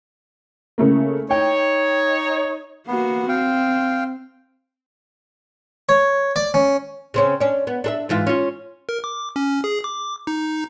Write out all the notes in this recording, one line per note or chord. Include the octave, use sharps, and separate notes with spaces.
C#3 A3 A#3
D#4 C#5 G5
A#3 B3 F#4
C4 F5 G5
C#5
D5
C#4
C#3 C4 C#4
C#4 D4
B3
D4 A4 E5
G#2 E3 F4
C#4 F4
A#4
D6
C#4
G#4
D6
D#4